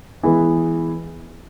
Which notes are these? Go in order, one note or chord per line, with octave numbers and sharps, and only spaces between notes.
E3 G#3 B3 E4